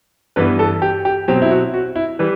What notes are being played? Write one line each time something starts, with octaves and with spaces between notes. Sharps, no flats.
G2 E3 B3 B4
A4
G4
G4
B2 F#3 C4 G4
E4
F#4
F#4
E4
E3 G3 B4